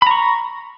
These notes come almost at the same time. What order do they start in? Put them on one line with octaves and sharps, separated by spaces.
B5 A#5 C#6